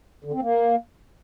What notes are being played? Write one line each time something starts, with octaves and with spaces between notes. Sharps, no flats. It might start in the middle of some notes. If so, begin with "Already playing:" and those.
D3
C4
A#3